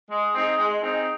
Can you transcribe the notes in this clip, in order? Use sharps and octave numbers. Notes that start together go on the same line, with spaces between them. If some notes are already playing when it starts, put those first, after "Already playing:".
G#3
C4 D#4 G#4
G#3
C4 D#4 G#4